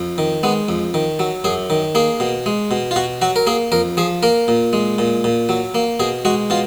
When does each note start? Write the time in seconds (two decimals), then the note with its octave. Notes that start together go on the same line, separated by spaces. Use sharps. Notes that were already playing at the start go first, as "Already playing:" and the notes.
Already playing: F2
0.18 D#3
0.43 G#3 B3
0.69 F2
0.94 D#3
1.19 F#3
1.44 F#2 G#4
1.70 D#3
1.95 A#3 G#4
2.20 B2
2.46 G#3
2.71 B2
2.91 F4
2.96 B2 F#4
3.22 F#3 F#4
3.36 A#4
3.47 A#3 G#4
3.72 F2 A#4
3.97 F3 G#4
4.23 A#3 A#4
4.48 A#2
4.73 G#3
4.98 A#2
5.24 A#2
5.49 F#3
5.75 A#3
6.00 B2 G#4
6.25 G#3 F#4
6.50 B2 F4